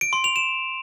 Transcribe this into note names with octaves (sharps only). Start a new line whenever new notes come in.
D7
C6
F7
E7